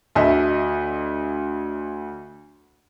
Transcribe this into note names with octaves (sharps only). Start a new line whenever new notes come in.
D2 D#5 E5